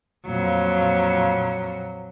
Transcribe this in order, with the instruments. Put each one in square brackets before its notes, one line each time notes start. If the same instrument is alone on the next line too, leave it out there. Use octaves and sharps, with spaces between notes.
[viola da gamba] F2 A#2 F#3